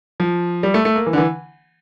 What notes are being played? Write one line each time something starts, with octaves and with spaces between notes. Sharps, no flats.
F3
G3
A3
A3
A#3
E3
D3
E3